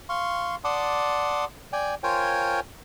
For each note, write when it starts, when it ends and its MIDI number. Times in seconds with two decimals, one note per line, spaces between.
0.09 0.55 77
0.09 0.55 84
0.09 0.55 85
0.64 1.45 74
0.64 1.45 78
0.64 1.45 81
0.64 1.45 84
0.64 1.45 86
0.64 1.45 87
1.73 1.95 74
1.73 1.95 79
1.73 1.95 80
2.03 2.60 65
2.03 2.60 70
2.03 2.60 72
2.03 2.60 73
2.03 2.60 79
2.03 2.60 80